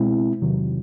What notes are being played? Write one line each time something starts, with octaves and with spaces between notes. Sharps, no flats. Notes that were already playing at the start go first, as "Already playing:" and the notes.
Already playing: B2 G#3 C4 E4
E2 C3 D#3 F#3